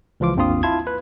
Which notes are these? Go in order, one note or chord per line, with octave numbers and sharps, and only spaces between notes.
C#2 E3 F3 F4 D6
G#1 D#2 C4 D4 F4 D#6
E4 F4 A5 G#6
B4